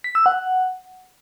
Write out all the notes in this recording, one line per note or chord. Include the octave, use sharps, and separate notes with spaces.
B6
E6
F#5